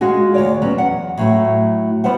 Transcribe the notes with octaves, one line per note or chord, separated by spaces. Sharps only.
G#3 F4 F#4 G#4
D2 C#5 D5
F#3 B3 C#4
E2 F#5
A2 F#3 A3
G3 B3 B4 C5 F#5